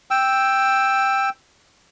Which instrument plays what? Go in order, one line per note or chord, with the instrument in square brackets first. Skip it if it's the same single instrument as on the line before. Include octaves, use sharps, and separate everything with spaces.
[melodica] G5 E6